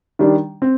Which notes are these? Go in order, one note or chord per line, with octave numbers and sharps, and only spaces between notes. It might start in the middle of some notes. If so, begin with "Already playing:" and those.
D#3 G3 D4
C4